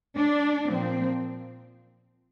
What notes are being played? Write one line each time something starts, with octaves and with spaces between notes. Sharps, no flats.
D4
A#2 F3 C4